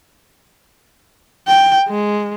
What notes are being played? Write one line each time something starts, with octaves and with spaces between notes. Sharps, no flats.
G5
G#3